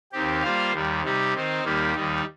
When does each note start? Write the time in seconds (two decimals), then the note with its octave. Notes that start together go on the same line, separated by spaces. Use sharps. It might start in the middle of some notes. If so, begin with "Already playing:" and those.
0.12 D#2 D#3 C4 G4
0.43 G3 A#3 F4 C5 F5
0.73 D#2 D#3 G3
1.03 C3 G3 D#4 G4
1.35 D#3 C4 D#4 C5
1.64 D#2 D#3 G3 A#3 G4
1.94 D#2 D#3 G3 D#4